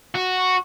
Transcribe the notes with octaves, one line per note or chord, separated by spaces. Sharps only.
F#4